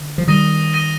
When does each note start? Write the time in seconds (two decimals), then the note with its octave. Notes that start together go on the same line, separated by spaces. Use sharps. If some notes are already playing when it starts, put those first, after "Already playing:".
Already playing: D3
0.18 F3
0.28 D#3 G3 D#6 A#6 D#7 G7
0.73 D#6 A#6 D#7 G7